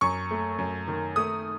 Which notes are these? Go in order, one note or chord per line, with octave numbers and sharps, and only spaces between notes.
F#2 C#6
A3
F#2
D#3
A3 D#6